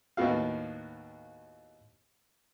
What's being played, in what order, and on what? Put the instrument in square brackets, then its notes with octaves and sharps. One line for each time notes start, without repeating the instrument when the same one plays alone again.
[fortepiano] D#2 A2 B3 F#4 F5